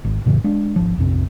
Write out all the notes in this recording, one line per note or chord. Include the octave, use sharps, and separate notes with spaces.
G#1
F2 A2 C#3 E3
G#3 D4
G#1 F3
A#1 F2 C3